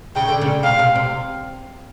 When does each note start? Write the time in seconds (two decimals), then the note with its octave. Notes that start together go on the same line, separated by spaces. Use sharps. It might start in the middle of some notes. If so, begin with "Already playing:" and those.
0.16 C#3 G5
0.29 D3
0.41 C#3
0.63 C3 F5
0.79 C3
0.95 C3